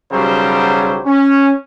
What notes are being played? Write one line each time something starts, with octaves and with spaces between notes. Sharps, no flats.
B1 C#3 F#3 G3 G4 C5
C#4